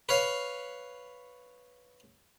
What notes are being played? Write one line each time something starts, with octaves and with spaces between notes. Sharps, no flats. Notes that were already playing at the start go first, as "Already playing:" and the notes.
B4 C#5 F5